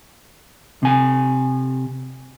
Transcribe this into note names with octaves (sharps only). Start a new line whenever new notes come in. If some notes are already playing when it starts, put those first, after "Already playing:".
C3 G#5